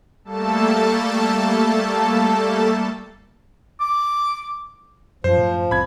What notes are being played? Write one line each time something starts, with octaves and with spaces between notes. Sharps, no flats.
G3 A3 A#3 A4 A5
D6
F#2 F3 C5
F#2 A2
C2 C4 B5 G#6